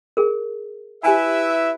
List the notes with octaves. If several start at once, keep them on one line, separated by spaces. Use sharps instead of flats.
G#4 A#4
E4 G4 B4 E5 G#5 A5